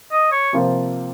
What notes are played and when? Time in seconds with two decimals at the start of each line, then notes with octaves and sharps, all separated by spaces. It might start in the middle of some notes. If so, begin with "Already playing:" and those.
0.12 D#5
0.32 C#5
0.53 C3 F3 A#3 F4 C5